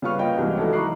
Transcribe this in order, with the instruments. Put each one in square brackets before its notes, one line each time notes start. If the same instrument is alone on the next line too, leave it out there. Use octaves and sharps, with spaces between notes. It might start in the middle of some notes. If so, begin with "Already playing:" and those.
[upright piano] C#3 G3 F4 B4 C#6 F6
A#3 F4 A#4 B4 D#5 G5
C2 B2 E3 G3 G#3
D#3 E3 F#3 A3 D#4 A4
A#5 B5 C#6 D6 F#6 C7